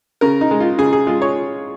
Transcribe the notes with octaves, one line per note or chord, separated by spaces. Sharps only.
C#3 A#4
D#4
G#3
F4
C#3 G#4
G#4
G#3 F4
C#5